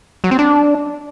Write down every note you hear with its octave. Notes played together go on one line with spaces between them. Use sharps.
F#3
C4
D4